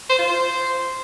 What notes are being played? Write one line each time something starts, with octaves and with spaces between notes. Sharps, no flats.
C5
F4
C5